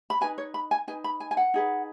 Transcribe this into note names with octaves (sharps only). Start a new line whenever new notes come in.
B5
D#4 F#4 B4 G#5
C#5
B5
G#5
D#4 B4 G#5
B5
G#5
G#5
F#5
D#4 G#4 B4